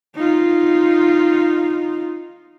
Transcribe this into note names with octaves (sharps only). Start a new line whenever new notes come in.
D#4 F4